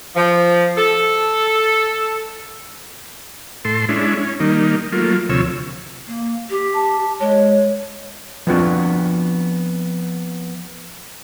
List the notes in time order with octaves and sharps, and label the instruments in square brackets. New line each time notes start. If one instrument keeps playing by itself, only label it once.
[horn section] F3
A4
[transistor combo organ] A2 A4 C6
G#3 C#4 D4 E4
C#4
D#3 G3 A#3 D#4
F#3 A3 A#3 F4
D2 C3 F3 C#5 E6
[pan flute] A#3
G4
[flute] A5
[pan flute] G#3 [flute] C#5
[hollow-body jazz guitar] F3 B3 C4 D4 F4 F#4